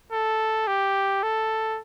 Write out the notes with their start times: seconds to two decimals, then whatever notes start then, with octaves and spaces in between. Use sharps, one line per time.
0.13 A4
0.67 G4
1.23 A4